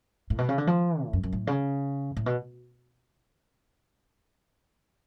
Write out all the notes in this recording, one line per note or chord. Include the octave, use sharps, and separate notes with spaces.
A2
B2
C#3
D3
F3
A2
F#2
F#2
A2
C#3
A2
B2